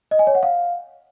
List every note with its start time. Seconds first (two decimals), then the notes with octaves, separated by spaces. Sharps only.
0.11 D#5
0.19 G#5
0.27 C#5
0.35 F#5
0.43 F5